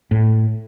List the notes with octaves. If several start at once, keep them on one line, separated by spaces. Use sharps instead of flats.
A2